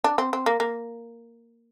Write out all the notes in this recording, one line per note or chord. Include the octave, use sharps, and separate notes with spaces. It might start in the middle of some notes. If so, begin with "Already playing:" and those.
D4
C4
C4
A#3
A#3